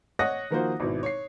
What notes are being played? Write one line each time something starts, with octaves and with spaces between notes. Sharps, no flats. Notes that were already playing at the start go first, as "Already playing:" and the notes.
C#5 D#5 F#5 D#6 F#6 A#6
D#3 F3 A#3 F4 F#4 C5
G#1 B2 E4
C#5 C7